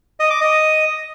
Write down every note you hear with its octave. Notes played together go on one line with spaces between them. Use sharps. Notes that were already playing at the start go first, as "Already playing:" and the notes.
D#5
D6
D#5